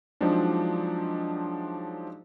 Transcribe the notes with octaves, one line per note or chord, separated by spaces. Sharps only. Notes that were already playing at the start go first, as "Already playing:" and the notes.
F3 F#3 G#3 C4 D4 D#4